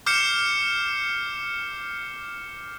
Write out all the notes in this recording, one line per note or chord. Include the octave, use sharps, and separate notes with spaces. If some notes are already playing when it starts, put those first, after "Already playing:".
D6 F6 G6 C7 C#7 E7